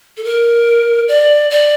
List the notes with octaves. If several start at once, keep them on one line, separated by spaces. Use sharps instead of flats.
A4
A#4
D5
D5